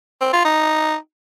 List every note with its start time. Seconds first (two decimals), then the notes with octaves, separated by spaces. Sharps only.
0.21 C4
0.33 F4
0.45 D#4